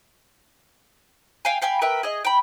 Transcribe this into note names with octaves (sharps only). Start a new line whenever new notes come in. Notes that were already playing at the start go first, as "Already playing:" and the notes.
F5 G5 G#5
F5 G5 G#5 B5
A#4 B4 E5 G5
G#4 D#5
G5 B5